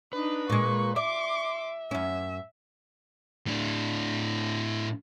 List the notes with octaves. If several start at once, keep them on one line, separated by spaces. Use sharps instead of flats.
D4 D#4 B4
A#2 G#3 C#6
D5 E5 C6 D6
F#2 C#4 E5
A2 D4